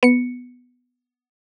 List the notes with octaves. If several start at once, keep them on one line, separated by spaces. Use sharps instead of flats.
B3 C#7